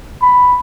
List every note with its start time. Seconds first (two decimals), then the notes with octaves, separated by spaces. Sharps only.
0.22 B5